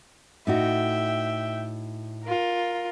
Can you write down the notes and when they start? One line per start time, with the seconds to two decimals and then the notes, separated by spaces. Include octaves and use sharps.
0.47 A2 D#4 F#4 E5 G5
2.25 F4 A#4